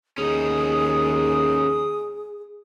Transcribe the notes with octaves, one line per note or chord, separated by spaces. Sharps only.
D#2 C#4 D#4 G#4 D#6